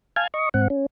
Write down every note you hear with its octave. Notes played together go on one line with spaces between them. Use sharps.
F5 G#5 A5 F6 G#6
D#5 C#6
G#2 C4 F#5
C#4